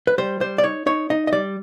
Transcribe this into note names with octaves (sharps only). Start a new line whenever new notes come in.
B4
G3 C5
G3 C5
D5
D#4 C#5
D#4 C#5
D#4 D#5
D#5
G3 D5